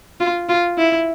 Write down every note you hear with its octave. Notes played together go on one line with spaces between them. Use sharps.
F4
F4
E4